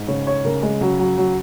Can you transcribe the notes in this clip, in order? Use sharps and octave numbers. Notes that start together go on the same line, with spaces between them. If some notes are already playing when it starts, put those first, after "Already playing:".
Already playing: G#2
C#3 C#5
C#5
C#3 A#4
G#3
C#3 F#3
F#3
F#3